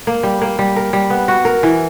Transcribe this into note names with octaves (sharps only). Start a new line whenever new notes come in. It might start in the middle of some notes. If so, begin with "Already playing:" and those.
A#3
G3
A#3
G3
A#4
G3
B3
F#4
A#4
E3